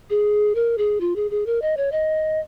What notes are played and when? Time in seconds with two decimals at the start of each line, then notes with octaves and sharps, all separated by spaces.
0.10 G#4
0.55 A#4
0.78 G#4
1.00 F4
1.16 G#4
1.31 G#4
1.46 A#4
1.62 D#5
1.77 C#5
1.92 D#5